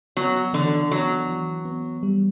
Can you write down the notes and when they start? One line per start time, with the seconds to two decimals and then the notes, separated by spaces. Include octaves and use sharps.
0.17 F#3 B3
0.53 D3 E3
0.91 F#3 B3
1.29 E3
1.65 B3
2.03 G3